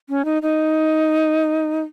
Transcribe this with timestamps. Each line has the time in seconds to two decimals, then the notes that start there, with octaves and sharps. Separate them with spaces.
0.09 C#4
0.25 D#4
0.42 D#4